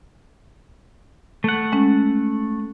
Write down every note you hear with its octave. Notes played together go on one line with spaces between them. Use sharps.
A3 F#5
G#3 C#4